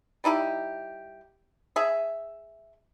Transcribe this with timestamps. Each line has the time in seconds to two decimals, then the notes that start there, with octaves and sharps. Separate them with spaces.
0.24 G3 D#4 E4 G4
1.76 G#4 E5